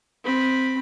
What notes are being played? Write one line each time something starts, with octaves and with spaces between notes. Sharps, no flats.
C4 B5